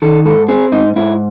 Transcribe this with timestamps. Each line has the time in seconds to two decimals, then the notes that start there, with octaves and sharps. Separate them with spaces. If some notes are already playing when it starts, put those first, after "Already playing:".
0.02 D#3 A4
0.25 G#2 A4
0.48 C4 G#4
0.72 G#2 D#4
0.96 G#2 E4